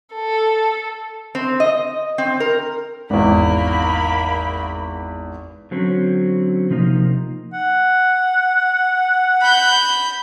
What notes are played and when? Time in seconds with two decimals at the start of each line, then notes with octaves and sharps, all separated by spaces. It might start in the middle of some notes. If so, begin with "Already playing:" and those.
0.14 A4
1.35 C4
1.60 D#5
2.18 C4
2.40 A#4
3.10 G#1 E2 A#3 B5
5.71 D3 F#3 C4 C#4
6.70 C3 F3 A#3 D#4
7.54 F#5
9.41 B5 G6